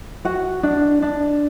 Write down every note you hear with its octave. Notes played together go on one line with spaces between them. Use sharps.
F#4 F#5
D4
D4